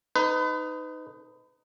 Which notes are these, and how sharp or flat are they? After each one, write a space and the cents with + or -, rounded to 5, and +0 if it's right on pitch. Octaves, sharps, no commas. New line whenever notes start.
D#4 +0 B4 +35